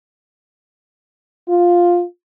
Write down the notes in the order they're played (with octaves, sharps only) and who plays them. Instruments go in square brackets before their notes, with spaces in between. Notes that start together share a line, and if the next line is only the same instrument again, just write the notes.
[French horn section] F4